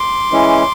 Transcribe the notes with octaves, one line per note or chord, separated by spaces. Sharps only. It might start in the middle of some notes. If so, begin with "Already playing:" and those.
Already playing: C6 D6
E3 G#3 C#4 E4